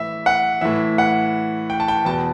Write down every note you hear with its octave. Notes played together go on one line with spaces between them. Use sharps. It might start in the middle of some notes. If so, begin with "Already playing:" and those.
Already playing: A2 E3 E5
F#5
A2 E3 E5
F#5
G5
A5
G5
E2 B2 A5